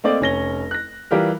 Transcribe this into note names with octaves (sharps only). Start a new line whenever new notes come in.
A3 A#3 C4 D5 D#5
F1 C#4 A#6 G7
F#6 A#6
E3 G3 F4 G4 A#4